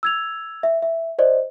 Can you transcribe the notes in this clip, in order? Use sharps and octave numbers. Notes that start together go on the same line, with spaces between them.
E6 G#6 F7
E5
E5
C5 D5 D#5